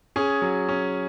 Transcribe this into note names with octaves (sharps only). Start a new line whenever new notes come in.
C#4 G#4
F#3
C#4